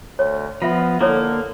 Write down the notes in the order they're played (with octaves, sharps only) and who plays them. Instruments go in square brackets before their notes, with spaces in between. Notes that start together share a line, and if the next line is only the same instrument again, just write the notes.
[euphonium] D2 [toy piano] C#5
[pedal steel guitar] F3 [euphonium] B3 [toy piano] F4 E5
[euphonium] D3 [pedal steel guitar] A#3 [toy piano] E4 A4 C#5